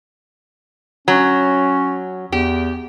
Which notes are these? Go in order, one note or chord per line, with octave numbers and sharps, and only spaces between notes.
F#3 C#4
E2 G4